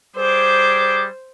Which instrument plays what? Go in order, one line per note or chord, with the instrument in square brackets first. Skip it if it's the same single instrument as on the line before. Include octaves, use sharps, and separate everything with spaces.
[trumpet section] G3 G#4 D6 [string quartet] C5